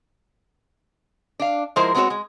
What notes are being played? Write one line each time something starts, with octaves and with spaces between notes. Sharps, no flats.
D4 F5
F3 G#3 E4 G#4 A#4 C5
G#3 B3 C4 F4 F#4 C#5
G#3